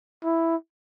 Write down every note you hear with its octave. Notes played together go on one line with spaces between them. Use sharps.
E4